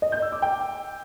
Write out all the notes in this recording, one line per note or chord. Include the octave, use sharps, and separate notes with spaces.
D#5
G6
E6
D6
G5